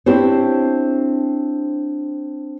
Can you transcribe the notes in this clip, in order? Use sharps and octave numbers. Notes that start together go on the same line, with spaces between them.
C4 D4 E4 G4 C5 C#5